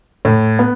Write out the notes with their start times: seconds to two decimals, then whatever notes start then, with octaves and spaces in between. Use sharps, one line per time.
0.25 A2
0.59 B3